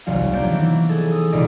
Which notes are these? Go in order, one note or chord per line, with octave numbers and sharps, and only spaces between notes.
D#1 C2 F#3 F5
A#3 B3 D4 D5 G6
D#3 E3
G#4 A4
D#6
C#2 B2 D#4 F4 D5 D#5